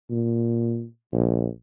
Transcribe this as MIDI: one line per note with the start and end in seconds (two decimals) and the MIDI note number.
0.10 0.85 46
1.13 1.47 34